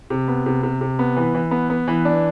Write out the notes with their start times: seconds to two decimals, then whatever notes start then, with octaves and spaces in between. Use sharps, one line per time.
0.10 C3
0.28 B3
0.46 C3
0.63 C3
0.81 C3
0.99 B3
1.16 E3
1.35 E3
1.51 B3
1.70 B3
1.88 E3
2.05 D4